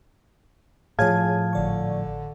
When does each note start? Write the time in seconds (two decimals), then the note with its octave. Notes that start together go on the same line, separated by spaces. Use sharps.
0.99 A2 F3 G#4 C#5 F5 G#5 A5 G#6
1.53 G#1 D3 D5 C#6